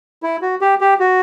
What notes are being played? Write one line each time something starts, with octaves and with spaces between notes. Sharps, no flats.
E4
F#4
G4
G4
F#4